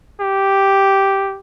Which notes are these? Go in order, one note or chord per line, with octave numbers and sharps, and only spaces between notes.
G4